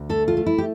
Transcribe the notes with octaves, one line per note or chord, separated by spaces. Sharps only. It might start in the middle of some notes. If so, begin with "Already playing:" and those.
Already playing: D2
A3 A4
F4
A3
E4
G4